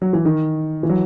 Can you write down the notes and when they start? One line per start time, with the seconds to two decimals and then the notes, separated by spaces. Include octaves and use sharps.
0.02 F#3
0.13 E3
0.25 D#3
0.83 E3
0.89 F#3